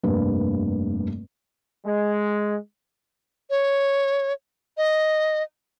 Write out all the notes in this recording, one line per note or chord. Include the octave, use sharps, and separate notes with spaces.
F1 G2 A#3 B4
G#3
C#5
D#5